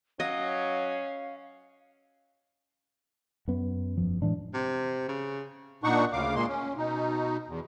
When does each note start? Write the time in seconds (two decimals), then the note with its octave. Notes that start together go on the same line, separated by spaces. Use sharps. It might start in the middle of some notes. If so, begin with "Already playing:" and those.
0.20 F#3 C#4 D#5 F5
3.48 F#2 B3
3.97 E1 F3
4.22 A2 E3 G#3 D4
4.54 C3
5.09 C#3
5.84 A#2 D4 D#4 F#5 C#6
6.12 D2 C#3 F5 D6
6.35 A#2 G#3 A#3 C6
6.48 C#4
6.77 B2 D#4
7.48 E2